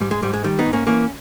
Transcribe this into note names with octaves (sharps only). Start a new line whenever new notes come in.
G#2 G3
G#3
G#2 G3
G#3
D#3 G3
B3 D#4
G#2
A#3 C#4
E3 A#3 C#4